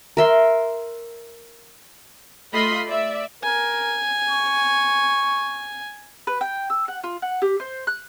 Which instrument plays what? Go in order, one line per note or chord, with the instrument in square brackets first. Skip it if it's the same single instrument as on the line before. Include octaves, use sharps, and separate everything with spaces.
[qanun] A#4 E5 C6
[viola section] A3 F4 D#5 B5 C6
D5 E5
[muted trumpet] A#4 [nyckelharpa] G#5
[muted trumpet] C#6
[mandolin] B4
G5
E6
F#5
F4
F#5
G4
C5
F#6